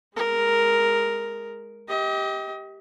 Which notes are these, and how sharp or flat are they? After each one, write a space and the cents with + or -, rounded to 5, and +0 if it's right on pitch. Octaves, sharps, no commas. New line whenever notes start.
G#3 +0 A#4 +0
G4 +0 D#5 +35